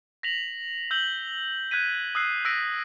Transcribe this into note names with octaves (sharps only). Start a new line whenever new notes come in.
A#6 B6 F7 F#7
E6 G6 F#7 G7
F#6 G#6 B6 D#7
D#6 E6 F#6 C7
E6 F#6 A#6 B6 D7